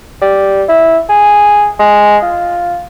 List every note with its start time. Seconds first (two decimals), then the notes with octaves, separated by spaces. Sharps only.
0.22 G3
0.69 E4
1.09 G#4
1.79 G#3
2.22 F4